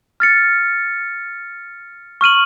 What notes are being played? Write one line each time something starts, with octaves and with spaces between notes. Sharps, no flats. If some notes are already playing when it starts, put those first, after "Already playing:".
F6 A6 C#7
C#6 F6 D#7 F#7